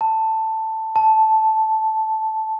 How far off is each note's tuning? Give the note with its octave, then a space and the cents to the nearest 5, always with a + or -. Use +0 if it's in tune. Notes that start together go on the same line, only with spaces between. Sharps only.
A5 +10
A5 -5